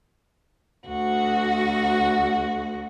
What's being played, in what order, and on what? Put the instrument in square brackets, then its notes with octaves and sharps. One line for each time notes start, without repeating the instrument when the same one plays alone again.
[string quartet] D2 F#4